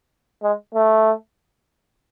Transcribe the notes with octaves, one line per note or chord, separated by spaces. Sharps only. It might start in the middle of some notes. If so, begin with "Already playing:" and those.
G#3
A3